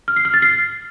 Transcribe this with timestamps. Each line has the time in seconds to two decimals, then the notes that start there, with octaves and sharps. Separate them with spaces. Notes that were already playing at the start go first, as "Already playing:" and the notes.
0.08 F6
0.16 C7
0.25 F6
0.34 A6
0.42 C7